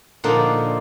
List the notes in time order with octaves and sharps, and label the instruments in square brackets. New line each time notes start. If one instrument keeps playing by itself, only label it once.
[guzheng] A#2 D3 F3 A#3 D4 D#4